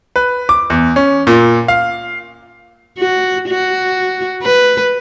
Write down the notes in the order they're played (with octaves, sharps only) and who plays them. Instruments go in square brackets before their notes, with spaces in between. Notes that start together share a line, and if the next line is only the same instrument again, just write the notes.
[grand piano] B4
D6
E2
C#4
A#2
F5
[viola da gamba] F#4
F#4
B4